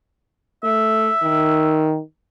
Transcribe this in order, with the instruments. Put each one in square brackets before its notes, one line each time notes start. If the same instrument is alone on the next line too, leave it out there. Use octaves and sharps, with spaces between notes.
[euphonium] A3 [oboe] E5
[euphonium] D#3